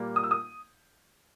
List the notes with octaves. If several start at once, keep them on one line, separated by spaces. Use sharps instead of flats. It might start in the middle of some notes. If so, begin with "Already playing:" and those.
Already playing: A#2 G3 A#3
D#6
E6
D#6